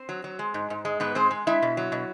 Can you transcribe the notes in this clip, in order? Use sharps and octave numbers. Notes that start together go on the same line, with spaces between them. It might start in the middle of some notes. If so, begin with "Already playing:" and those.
Already playing: C4 C5
F#3
F#3
G#3
G#2
G#2
G#3
G#2 B3 B4
G#3 C4 C5
G#3
G#3 E4 E5
B2
F#3
B2